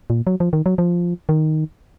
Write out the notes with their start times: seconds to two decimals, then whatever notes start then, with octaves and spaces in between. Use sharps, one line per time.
0.10 A#2
0.27 F#3
0.40 F3
0.53 D#3
0.66 F#3
0.78 F3
1.29 D#3